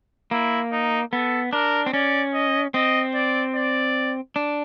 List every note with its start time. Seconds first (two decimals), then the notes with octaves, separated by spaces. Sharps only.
0.31 A#3 E4
0.72 D#4
1.13 B3 A4
1.53 D4 A#4
1.86 C4
1.94 C#4 D5
2.34 D#5
2.74 C4 D#5
3.15 D5
3.56 D5
4.36 D4